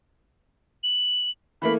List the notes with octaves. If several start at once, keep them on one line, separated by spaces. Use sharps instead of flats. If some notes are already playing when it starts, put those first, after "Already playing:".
F#7
E3 A3 A#3 B5